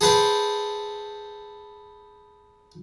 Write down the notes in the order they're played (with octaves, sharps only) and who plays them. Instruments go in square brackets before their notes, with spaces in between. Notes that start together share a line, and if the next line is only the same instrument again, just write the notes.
[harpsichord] G#4 A4 B4 C5 G5